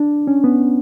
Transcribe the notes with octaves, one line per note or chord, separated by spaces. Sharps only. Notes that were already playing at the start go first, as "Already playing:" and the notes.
Already playing: D4
C#4
B3